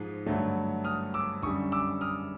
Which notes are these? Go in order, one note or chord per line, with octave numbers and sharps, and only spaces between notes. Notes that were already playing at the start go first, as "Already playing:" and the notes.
Already playing: G#2 F3 G#3
G2 D3 F#3 A3
D#6 F6
D6 E6
F#2 D3 G3 C#6 D#6
D6 E6
D#6 F6